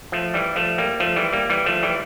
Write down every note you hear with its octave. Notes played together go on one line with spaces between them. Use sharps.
F3 A3
E3 G3
F3 A3
G3 A#3
F3 A3
E3 G3
G3 A#3
E3 G3
F3 A3
E3 G3